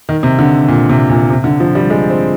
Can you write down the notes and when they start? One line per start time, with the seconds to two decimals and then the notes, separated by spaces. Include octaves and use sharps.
0.09 D#3
0.23 C3
0.39 D3
0.68 A#2
0.90 C3
1.10 A#2
1.30 C3
1.44 D3
1.60 F3
1.75 G3
1.90 G#3
2.10 C4